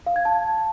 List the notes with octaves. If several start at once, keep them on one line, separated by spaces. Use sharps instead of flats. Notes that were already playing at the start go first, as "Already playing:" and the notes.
F5
G#6
A5